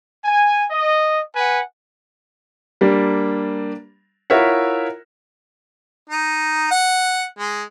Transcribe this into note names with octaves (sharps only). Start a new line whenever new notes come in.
G#5
D#5
B4 F#5 G#5
G3 A#3 D4
E4 F4 A#4 C#5 E5 F#5
D#4
F#5
G#3